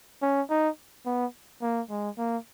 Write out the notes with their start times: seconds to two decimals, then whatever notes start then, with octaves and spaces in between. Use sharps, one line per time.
0.22 C#4
0.50 D#4
1.06 B3
1.62 A#3
1.90 G#3
2.18 A#3